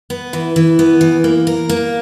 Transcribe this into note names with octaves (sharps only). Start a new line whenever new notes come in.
B3
E3
E3
B3
E3
A#3
A#4
A#3